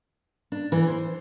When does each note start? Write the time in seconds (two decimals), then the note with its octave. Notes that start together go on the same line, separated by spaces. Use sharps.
0.52 D4
0.72 E3
0.87 C5